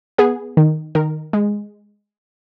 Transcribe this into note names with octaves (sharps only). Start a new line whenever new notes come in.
B3 G#4
D#3
D#3 A#4
G#3